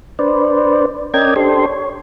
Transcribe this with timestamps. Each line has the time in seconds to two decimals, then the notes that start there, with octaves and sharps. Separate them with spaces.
0.19 D4 B4 C5 D5
1.14 C#4 A#4 D5 D#5 G5 G#6
1.36 D4 G4 A4 C5 C6
1.66 C#5